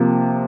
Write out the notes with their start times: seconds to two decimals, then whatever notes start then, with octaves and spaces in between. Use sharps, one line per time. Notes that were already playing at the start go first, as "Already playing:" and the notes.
Already playing: C3 F3 A#3